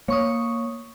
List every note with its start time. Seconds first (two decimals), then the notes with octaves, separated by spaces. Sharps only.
0.08 A#3 C#5 C#6 D#6